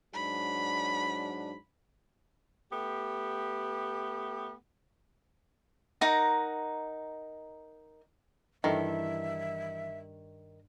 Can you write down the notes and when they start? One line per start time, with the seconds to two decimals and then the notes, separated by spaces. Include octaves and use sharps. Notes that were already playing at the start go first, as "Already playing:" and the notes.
0.14 G#2 F#3 D4 B5
2.72 A3 B3 G4
6.01 D#4 A#4 F#5 A#5
8.64 G2 D#3 E3 E4 A4 E5